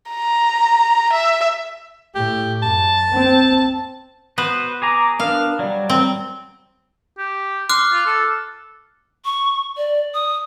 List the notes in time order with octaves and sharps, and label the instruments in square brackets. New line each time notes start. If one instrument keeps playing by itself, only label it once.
[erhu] A#5
E5
[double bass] A2 [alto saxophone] G4
[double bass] F#2 [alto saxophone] A5
[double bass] C4
[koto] B3 [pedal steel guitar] F#4 B4 C5
[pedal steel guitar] G#4 G#5 A#5 [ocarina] D6
[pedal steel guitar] B3 D4 [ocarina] A#4 [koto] F5
[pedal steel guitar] F#3 G3 [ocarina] D5
[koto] C4
[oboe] G4
[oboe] C6 [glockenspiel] D6 F6 F#6
[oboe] F4
A4
[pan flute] C#6
D5
D#6